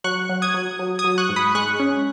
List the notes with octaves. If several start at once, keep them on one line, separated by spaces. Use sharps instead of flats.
F#3 C#6 F#6
F#3
D#6 G#6
F#3
F#3
D#6 G#6
F#3
C#6 F#6
G#2
B5 D#6
G#3 C#6 F#6
C#4